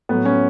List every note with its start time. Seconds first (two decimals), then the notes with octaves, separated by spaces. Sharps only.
0.09 A2 F#3 B3
0.25 C#4